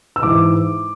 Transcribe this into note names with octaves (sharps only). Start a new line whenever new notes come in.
E6
G#2 E3 D6